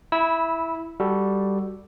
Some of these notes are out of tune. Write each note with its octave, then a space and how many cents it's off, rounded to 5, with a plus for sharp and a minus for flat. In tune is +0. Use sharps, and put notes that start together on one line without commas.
E4 +0 B5 -20 E6 -15
G3 +0 F#4 +10 A4 +0